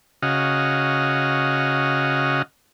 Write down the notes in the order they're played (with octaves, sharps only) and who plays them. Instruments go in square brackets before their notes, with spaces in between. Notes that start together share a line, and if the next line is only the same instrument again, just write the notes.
[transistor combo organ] C#3 F#4 D#5 F5